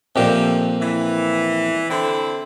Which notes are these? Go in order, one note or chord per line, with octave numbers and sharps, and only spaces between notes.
F2 A#2 F3 A3 G4
E3
D3 C4 E4